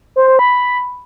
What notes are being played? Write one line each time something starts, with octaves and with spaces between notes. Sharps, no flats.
C5
C5
B5